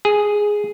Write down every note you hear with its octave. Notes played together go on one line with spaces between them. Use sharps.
G#4